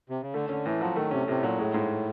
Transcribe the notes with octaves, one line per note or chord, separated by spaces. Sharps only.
C3
C#3
D3 A3
D3 C#4
A2 E3
F3 F#3
D#3 A3
C3 C#4
A2 C3
A#2 F#3
A2 G#3
G#2